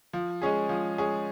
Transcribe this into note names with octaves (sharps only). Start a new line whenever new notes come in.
F3
G#3 C#4 G#4
F3
G#3 C#4 G#4